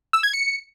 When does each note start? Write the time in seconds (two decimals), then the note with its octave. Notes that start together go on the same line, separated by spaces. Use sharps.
0.13 E6
0.23 G#6
0.33 C#7